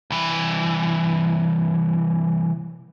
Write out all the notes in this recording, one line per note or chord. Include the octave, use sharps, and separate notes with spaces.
C2 E3